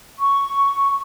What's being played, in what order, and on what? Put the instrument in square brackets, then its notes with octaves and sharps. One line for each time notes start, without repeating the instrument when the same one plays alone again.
[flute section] C#6